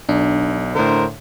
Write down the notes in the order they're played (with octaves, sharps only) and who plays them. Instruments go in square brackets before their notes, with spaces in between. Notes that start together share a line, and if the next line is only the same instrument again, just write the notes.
[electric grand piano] B1 [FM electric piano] D4
[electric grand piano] A2 D3 [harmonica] A#4 C5